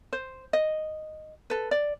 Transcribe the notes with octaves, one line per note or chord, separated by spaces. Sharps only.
C5
D#5
A4 B4
D5